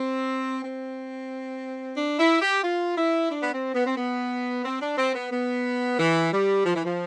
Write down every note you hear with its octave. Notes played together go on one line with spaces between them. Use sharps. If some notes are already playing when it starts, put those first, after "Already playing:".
Already playing: C4
C4
D4
E4
G4
F4
E4
D4
B3
C4
B3
C4
B3
C4
D4
C4
B3
B3
E3
G3
F3
E3
F3